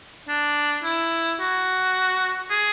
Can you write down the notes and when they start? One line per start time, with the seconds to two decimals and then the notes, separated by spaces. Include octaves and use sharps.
0.29 D4
0.84 E4
1.40 F#4
2.51 G#4